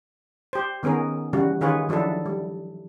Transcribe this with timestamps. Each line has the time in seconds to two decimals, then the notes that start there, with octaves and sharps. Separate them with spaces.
0.53 G4 C5
0.83 D#3 B3 C#4 G#4 A#4
1.33 C#3 E3 G3 F#4
1.61 D#3 F4 G#4 B4 C#5
1.89 F3 F#3 D4 E4 A4
2.26 G3